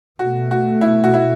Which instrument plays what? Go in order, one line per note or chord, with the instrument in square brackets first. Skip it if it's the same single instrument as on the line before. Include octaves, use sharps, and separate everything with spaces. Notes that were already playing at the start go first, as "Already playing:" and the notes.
[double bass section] B2 A3 [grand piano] F#4
[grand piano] F#4
E4
F#4
E4